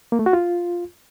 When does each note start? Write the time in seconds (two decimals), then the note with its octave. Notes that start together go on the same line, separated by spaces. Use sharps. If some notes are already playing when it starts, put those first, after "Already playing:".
0.12 A#3
0.19 A3
0.26 F#4
0.33 F4